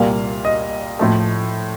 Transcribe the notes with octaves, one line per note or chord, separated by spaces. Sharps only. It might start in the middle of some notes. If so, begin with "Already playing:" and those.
Already playing: C2 A#2 G3 A#3 F5
D#5
A2 F3 A3